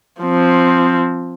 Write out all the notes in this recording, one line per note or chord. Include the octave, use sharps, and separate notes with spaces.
F3 C4